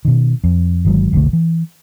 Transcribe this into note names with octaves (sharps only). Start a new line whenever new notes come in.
B2 D#3
F2
G1 D#3 F#3 G#3
F1 B1 D3 A3
E3